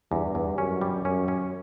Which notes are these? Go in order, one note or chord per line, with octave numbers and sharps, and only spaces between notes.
E2 G2
E2
F#2 C#4
G3
F#2 C#4
C#4